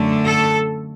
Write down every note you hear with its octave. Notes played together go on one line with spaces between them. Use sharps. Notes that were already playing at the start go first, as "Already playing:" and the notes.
Already playing: F#2 D3 A3
A4